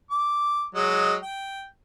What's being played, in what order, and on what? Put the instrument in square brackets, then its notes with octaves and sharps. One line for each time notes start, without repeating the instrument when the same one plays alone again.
[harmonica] D6
F#3 G#3 D#5
G5